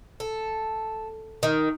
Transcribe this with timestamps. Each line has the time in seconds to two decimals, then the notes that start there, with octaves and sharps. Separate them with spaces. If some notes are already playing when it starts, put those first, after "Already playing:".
0.20 A4
1.43 D#3